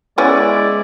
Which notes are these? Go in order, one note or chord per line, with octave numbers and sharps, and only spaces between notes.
G#3 B3 C#4 E4 D5